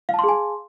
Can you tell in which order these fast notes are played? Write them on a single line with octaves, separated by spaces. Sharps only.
F5 A5 C6 G#4 G#5